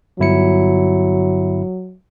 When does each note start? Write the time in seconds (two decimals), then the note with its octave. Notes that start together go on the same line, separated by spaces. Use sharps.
0.19 G1 F#3 E4 C#7